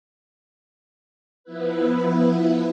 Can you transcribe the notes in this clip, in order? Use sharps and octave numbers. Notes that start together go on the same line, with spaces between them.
F3 B3 E4 B4